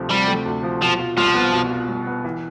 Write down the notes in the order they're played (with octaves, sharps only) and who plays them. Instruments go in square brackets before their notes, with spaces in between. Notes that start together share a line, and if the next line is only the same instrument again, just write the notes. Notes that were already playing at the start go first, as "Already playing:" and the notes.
Already playing: [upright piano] D2 C3 F3 A3
[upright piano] C3 [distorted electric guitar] G3
[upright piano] A3
D2
F3
[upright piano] B2 [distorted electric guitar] F3
[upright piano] F4
[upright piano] C2 [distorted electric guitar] F3
[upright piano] B3
B2
F4
C2
B3
E3